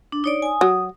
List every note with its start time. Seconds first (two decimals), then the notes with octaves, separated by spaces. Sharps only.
0.12 D4
0.24 D#4 C#5 D5
0.42 G#5 D#6
0.61 F#3 D#6